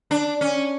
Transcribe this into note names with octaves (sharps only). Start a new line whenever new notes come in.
D4
C#4